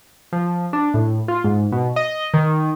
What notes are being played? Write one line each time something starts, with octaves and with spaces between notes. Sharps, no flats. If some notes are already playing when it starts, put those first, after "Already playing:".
F3
D4
A2
F4
G#2
B2
D#5
D#3